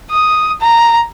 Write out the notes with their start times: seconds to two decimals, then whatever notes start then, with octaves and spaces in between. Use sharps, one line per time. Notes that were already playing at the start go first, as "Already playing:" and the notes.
0.10 D#6
0.61 A#5